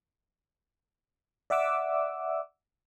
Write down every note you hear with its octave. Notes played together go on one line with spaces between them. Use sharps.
D5 E5 F#5 D6 E6